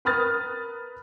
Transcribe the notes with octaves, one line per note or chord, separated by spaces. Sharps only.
A#4 B4 B5 D#6 F6 A6